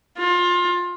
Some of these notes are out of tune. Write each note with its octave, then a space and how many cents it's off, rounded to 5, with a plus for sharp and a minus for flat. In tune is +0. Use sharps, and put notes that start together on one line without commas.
F4 +25